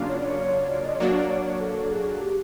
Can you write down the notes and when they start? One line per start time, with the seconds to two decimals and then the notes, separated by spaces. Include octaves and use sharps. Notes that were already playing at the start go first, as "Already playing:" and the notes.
Already playing: C#3 F#3 A#3 D4 F4
0.08 C#5
0.17 D5
0.25 C#5
0.69 D5
0.85 D#5
0.95 C#5
1.00 F#3 A#3 D4 F#4 D5
1.14 D5
1.30 C#5
1.45 C#5
1.61 A4
1.92 G#4
2.21 G4